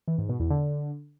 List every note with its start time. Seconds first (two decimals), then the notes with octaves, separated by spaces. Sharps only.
0.08 E3
0.18 G#2
0.29 B2
0.40 E2
0.50 D3